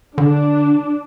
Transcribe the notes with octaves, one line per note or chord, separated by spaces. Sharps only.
D3 D4